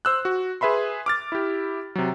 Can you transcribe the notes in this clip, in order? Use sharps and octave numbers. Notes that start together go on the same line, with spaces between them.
C5 E6 F#6
F#4
G#4 B4 E5 B5 C6
D6 F6 A6
E4 G4
C3 F#3